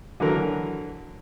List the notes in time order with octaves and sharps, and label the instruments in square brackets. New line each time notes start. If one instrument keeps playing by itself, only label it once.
[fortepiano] D3 E3 F#3 A#4